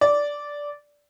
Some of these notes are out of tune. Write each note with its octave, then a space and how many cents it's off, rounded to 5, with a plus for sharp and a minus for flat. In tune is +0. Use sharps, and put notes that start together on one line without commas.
D5 -10